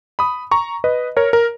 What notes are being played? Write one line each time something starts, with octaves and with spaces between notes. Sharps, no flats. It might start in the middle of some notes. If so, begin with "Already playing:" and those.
B5 D#6
A#5 C#6
B4 D#5
A#4 C#5
A#4